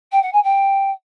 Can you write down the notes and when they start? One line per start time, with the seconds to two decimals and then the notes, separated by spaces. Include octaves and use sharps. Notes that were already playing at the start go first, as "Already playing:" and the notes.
0.12 G5
0.22 F#5
0.33 G#5
0.43 G5